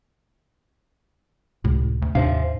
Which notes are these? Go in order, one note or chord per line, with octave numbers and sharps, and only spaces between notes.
C#2 A2 C3
D2
D#2 G#2 C3 D4 C5 E5 F5